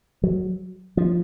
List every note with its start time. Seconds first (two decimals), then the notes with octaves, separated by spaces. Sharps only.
0.23 F#3
0.97 F3